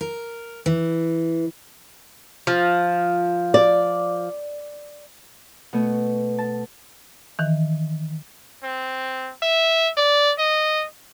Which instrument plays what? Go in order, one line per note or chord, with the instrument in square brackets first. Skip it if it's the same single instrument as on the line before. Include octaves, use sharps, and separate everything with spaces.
[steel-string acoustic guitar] A#4
E3
[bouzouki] F3
[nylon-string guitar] D5
[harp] B2 A3 B3
A5
[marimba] D#3 E3
[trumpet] C4
E5
D5
D#5